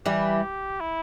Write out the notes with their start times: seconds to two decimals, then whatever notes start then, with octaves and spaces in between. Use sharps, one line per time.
0.06 E3 G3 G4
0.81 E4